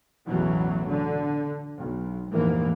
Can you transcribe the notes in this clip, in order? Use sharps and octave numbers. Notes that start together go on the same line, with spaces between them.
A1 E2 B2 E3 F#3
D3
B1
F1 A#1 G#2 E3 A#3